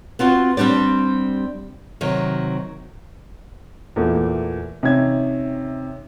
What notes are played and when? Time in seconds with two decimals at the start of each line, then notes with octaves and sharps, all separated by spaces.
0.19 B3 C4 F4 F#4
0.57 G3 C4 D4 G4 D5
2.01 C3 D#3 F#3
3.96 E2 A#2 A3 A#3
4.83 C3 C#4 D#4 E5 G#6